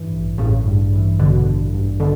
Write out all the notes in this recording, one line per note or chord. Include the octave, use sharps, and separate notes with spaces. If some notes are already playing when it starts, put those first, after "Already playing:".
Already playing: G2 E3
A1
A1 A2 C#3
G2
E3
A1 B2 D3
A1
G2
B2 D3